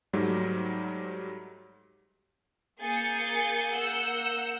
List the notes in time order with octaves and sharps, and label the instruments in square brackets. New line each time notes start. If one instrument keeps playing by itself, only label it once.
[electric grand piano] G#2 F#3 G3 A3
[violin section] A#3 G#4 G#5 G6 A6 C#7
A#3 F#5 E6 G6 C#7